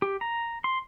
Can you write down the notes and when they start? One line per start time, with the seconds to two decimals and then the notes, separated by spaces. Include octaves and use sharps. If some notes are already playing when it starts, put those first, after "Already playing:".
0.02 G4
0.21 A#5
0.64 C6